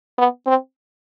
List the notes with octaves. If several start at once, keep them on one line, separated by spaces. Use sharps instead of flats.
B3
C4